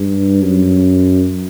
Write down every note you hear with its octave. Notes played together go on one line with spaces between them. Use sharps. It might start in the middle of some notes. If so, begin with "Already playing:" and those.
Already playing: G2
F#2